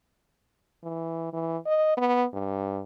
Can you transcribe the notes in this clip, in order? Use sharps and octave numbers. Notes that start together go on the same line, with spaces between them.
E3
E3
D#5
B3
G2